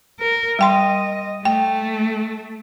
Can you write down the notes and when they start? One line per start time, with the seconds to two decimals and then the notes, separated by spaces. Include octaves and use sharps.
0.20 A#4
0.59 G3 D#5 G5 C6
1.45 A3 G5